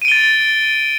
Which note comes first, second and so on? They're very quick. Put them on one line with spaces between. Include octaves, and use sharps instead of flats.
D#7 D7 G7 A6